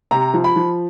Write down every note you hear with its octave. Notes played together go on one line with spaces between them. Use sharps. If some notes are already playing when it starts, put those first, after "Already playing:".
C3 A#5
F3
B5
F3